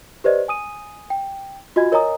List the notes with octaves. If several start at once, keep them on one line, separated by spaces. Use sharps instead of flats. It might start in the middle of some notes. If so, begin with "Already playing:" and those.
G4 B4 C5 D5 D#5
G#5 D#6 D#7
G5
F4 F#4 D#5 G#5 G#6
A#4 C#5 D#5 G#5 A#5 D#6